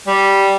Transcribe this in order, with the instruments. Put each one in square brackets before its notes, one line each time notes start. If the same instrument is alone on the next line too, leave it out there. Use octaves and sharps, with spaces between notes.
[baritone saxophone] G3